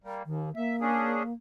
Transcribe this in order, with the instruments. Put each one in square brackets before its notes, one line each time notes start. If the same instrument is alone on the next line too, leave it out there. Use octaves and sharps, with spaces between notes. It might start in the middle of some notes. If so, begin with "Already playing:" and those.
[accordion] G3 A#3
[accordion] D#2 [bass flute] D#3
[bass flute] A#3 [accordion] E5
[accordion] C#4 D4 G#4